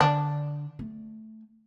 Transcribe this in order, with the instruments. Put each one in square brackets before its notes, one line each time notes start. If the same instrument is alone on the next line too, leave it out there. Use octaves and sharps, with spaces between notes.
[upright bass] D3 [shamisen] D4
[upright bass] A3